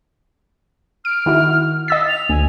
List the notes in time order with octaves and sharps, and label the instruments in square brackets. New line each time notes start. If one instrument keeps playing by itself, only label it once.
[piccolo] F6 [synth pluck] D7
[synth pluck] D#3 E4 F#4
[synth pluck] D#5 E6 B6 [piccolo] A6
[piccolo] F7
[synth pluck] D2 [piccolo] G#5